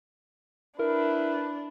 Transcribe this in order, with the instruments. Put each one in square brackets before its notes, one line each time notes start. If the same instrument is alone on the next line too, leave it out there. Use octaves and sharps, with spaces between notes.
[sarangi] D4 [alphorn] E4 [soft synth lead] A#4 [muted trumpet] B4